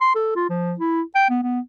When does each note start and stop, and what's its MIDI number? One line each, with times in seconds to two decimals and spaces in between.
0.01 0.15 84
0.15 0.33 69
0.36 0.45 65
0.49 0.74 53
0.79 1.01 64
1.15 1.28 79
1.30 1.39 59
1.43 1.60 59